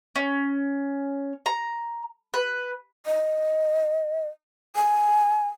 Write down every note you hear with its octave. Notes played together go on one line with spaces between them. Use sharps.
C#4
A#5
B4
D#5
G#5